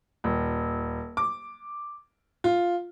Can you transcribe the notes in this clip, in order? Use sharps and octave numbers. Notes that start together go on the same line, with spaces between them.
D#1
D6
F4